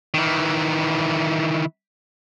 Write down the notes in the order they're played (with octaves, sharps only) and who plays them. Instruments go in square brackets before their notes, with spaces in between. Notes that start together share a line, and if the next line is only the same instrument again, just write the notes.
[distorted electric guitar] D#3 E3